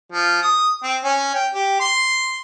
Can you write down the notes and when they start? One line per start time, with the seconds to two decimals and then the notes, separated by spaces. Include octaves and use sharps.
0.12 F3
0.42 D#6
0.83 C4
1.04 C#4
1.34 G5
1.54 G4
1.80 C6